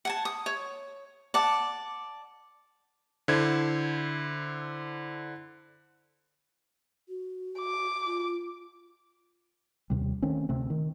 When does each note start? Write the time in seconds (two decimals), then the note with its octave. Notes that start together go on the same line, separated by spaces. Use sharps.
0.05 F#5 G#5 A5
0.25 D#6
0.46 C#5
1.34 D5 F#5 A5
3.28 D3 E4 C5 G#6
7.09 F#4
7.60 D6
8.06 F4
9.90 D#2 C3 G3
10.22 D#3 A3 C4 C#4
10.49 D2 C3 A3 C4
10.70 D#3